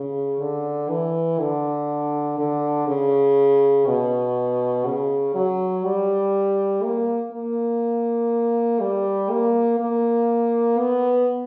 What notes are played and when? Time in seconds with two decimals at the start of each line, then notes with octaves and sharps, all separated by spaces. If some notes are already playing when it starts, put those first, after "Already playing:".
Already playing: C#3
0.41 D3
0.89 E3
1.40 D3
2.39 D3
2.88 C#3
3.87 B2
4.86 C#3
5.35 F#3
5.85 G3
6.84 A#3
7.33 A#3
8.81 G3
9.30 A#3
9.80 A#3
10.79 B3